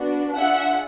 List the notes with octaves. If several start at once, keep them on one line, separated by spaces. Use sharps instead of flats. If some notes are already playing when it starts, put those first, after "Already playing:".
Already playing: B3 D4 F#4
D4 F4 G#4 E5 F#5